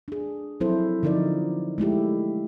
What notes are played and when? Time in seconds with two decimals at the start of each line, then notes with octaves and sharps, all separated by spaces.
0.08 D4 G#4
0.60 F3 F#3 C4 E4 A4 C5
1.03 D3 F3 D#4 A#4 D5
1.78 G#3 A3 E4 G4